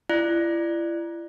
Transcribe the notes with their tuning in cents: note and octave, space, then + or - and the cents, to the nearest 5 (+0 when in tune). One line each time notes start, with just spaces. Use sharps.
E4 +40 D5 +20